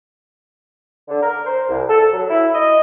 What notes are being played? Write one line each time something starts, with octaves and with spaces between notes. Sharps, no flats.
D3
A#4
C5
C2
A4
F#3
E4
D#5